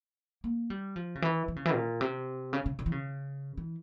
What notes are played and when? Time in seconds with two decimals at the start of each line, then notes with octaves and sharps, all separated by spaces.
0.44 A#3
0.70 G3
0.96 F3
1.15 C#3
1.22 E3
1.48 E3
1.56 C#3
1.65 E3
1.74 A#2
2.01 C3
2.53 C#3
2.66 C#3
2.79 C#3
2.86 E3
2.92 C#3
3.57 E3